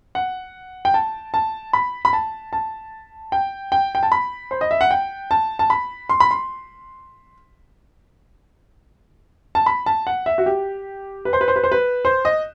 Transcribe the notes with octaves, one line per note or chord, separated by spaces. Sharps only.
F#5
G5
A5
A5
B5
B5
A5
A5
G5
G5
G5
A5
B5
C5
D#5
E5
F#5
G5
A5
A5
B5
C6
B5
C6
A5
B5
A5
F#5
E5
F#4
G4
B4
C5
B4
C5
B4
C5
B4
C5
D#5